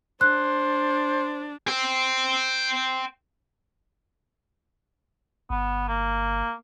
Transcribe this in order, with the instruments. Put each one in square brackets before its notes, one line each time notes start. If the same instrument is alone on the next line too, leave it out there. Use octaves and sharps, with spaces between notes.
[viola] D4 [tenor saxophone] C5 [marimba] F#6
[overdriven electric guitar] C5 G5
[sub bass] G1 [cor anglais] B3
[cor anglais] A#3